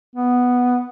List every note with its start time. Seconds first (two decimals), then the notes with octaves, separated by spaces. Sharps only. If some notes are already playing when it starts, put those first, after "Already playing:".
0.15 B3